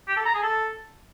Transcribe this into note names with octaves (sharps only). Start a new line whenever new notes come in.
G4
A4
A#5
G#4
A4